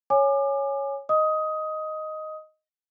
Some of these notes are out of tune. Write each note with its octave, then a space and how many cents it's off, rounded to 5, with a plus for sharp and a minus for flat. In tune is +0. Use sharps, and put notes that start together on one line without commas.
C#5 +0 G#5 +0 D6 +35
D#5 +0 D#6 +15